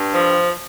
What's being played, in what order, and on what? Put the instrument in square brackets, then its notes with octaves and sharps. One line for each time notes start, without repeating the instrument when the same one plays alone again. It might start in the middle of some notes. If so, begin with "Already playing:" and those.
Already playing: [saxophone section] G2
F3